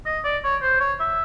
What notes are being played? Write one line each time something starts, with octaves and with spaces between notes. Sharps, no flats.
D#5
D5
C#5
C5
C#5
E5